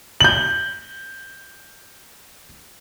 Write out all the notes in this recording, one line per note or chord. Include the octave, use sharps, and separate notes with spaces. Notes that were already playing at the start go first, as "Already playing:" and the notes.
G6 F#7